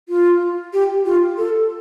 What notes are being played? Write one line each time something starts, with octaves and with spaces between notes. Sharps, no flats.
F4
G4
F4
A4